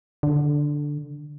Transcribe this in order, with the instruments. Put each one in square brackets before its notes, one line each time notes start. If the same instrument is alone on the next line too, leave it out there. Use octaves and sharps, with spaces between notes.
[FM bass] D3